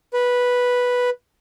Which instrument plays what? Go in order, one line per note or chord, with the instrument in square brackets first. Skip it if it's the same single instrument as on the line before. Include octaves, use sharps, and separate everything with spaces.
[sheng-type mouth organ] B4